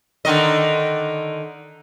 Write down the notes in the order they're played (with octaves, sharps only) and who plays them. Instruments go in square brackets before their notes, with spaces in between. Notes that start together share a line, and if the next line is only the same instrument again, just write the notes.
[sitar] D3 D#3 D#5